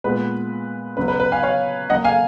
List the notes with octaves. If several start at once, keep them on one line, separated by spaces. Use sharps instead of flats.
A#2 G#3 B3 B4
C#3 F#3 B3 B4
B4
B4
F5 G#5
C#5 F5
C#3 F#3 A#3 D#5 F#5
F5 G#5